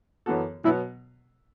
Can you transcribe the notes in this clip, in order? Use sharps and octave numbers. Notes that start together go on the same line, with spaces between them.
F#2 E3 B3 F#4 A4
B2 F#3 B3 E4